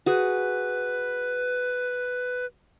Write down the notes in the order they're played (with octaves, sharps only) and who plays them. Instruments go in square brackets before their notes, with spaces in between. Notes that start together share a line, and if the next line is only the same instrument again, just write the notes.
[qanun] F#4 G#4 [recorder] B4